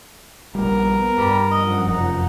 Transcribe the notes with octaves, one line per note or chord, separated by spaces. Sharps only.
A#1 G3 B3 A#4
G2 G3 A#5
F#2 F3 D#5 F#5
F1 D#4